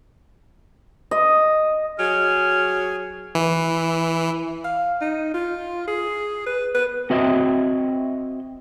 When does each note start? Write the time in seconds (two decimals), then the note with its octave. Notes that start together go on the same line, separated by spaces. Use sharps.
1.11 D#5
1.99 F#3 G#4 G#5 F6
3.35 E3
4.64 F5
5.01 D#4
5.34 F4
5.88 G#4
6.47 B4
6.75 B4
7.10 C4 F#4 D#5 E5